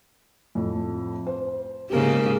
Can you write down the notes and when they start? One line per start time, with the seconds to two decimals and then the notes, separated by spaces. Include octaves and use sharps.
0.55 F2 A2 A3
1.27 C5
1.90 G#2 C#3 A#3 G4 A#4